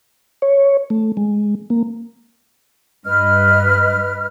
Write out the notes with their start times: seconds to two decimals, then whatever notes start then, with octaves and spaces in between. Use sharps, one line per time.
0.42 C#5
0.90 A3
1.17 G#3
1.70 A#3
3.05 G2 B4 D#5 F6